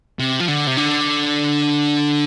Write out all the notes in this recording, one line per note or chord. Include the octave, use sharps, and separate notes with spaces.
C3
F3
D3
C3
D3